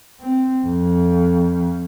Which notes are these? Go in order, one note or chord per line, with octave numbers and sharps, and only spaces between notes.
C4
F2